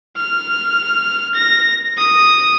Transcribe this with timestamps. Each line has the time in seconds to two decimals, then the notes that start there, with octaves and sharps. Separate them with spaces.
0.16 F6
1.35 A#6
1.97 D#6